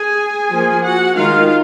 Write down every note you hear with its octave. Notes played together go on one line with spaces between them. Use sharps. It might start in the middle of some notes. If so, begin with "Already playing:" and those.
Already playing: G#4 G#5
F3 A#3 F4
F#4 F#5
D#3 G#3 D#4 F4 F5